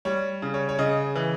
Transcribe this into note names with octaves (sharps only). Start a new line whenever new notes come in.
G3 C#5
C#3
C#5
C#5
C#3 D#5
E3